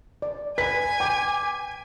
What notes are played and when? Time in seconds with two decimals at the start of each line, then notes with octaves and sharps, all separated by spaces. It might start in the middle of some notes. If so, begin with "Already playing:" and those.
0.22 D5
0.58 B4 G#5 B6
1.00 G5 D6